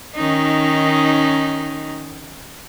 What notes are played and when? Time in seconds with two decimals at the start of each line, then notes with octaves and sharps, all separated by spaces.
0.15 D#3 C#4 D#4